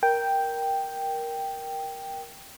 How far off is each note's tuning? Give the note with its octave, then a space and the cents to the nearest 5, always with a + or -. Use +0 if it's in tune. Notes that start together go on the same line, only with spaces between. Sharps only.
A#4 +10 G5 +0